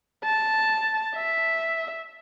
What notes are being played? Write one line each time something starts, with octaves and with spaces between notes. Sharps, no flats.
A5
E5